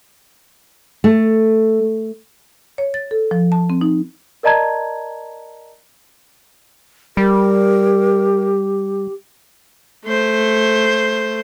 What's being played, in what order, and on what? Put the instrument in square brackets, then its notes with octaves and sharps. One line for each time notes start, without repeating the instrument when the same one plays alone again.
[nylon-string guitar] A3
[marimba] C#5
A6
A4
F3
A5
C4
D#4
[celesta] A#4 D5 D#5 A5 A#5 G#6
[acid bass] G3 [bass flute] G4 [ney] A#4
[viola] A3 C5